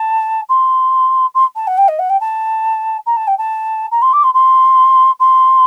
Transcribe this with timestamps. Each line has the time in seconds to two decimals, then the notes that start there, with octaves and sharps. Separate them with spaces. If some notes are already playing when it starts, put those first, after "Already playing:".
Already playing: A5
0.49 C6
1.35 C6
1.56 A5
1.67 F#5
1.78 G5
1.88 D#5
1.99 F#5
2.10 G5
2.21 A5
3.06 A#5
3.17 A5
3.28 G5
3.38 A5
3.92 A#5
4.02 C6
4.13 D6
4.24 C6
4.34 C6
5.20 C6